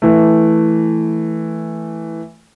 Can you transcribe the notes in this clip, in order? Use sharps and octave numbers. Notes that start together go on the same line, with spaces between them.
E3 A3